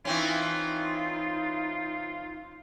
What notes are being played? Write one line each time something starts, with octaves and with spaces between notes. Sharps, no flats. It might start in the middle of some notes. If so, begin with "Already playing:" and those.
E3 C4 C#4 D#4 F4